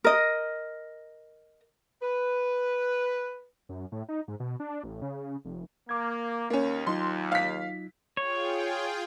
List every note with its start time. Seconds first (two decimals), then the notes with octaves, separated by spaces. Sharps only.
0.04 A#4 D#5
2.02 B4
3.69 F#2
3.92 A2
4.09 D#4
4.28 G#2
4.40 B2
4.60 D4
4.84 A1
5.02 C#3
5.45 F1
5.89 A#3 D6 G#6
6.50 D#2 A#3 C#4
6.87 F#3 D#4 F4 C6
7.32 F5 B6
8.17 F4 G#4 C#5 G5